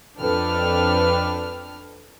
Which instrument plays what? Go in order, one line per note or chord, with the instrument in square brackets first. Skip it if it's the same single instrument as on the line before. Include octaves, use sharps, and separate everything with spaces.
[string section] F2 D4 A4 B4 G5 F6